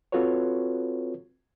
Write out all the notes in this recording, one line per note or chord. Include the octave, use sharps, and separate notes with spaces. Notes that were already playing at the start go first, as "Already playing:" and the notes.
C4 F4 F#4 A4 B4 C#5